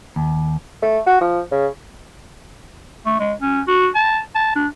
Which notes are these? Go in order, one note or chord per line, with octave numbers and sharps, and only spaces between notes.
D#2
A3
F#4
F3
C#3
A3
G#3
C#4
F#4
A5
A5
D4